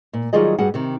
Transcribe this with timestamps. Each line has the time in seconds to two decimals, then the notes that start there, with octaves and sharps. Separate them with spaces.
0.13 A#2
0.33 D#3 F#3 G3 F4 G#4 D#5
0.58 G2 G3 F#4 G#4 F#5
0.74 C3 D#3